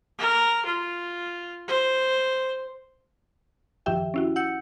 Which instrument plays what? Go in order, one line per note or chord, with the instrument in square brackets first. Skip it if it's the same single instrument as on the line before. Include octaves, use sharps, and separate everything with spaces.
[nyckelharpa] A#4
F4
C5
[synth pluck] F#2 D#3 F3 G4 E5 G5
C#4 E4 F#4
F#5 E6 G6 C#7